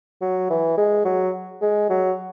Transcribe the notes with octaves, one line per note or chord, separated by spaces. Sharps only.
F#3
E3
G#3
F#3
G#3
F#3